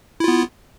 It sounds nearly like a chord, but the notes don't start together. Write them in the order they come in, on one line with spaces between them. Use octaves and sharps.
E4 F4 B3